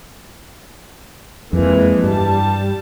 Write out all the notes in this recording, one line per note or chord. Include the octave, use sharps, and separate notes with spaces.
F2 E3 G#3 A#3
G2 G3 A5